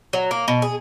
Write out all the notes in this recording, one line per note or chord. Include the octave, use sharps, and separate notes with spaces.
F#3
A#3
B2
G#4